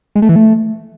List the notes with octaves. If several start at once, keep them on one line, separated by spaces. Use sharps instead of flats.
G#3
A3
E3
A3